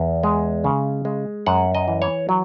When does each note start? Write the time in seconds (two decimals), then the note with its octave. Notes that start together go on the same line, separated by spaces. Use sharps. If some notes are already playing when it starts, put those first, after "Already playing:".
Already playing: E2
0.23 G#3
0.64 C#3
1.05 G#3
1.46 F#2 F#5
1.75 D#5
1.88 E3
2.02 C#5
2.29 F#3